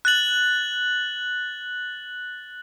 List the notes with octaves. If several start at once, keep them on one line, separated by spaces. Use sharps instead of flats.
F#6 A6 F#7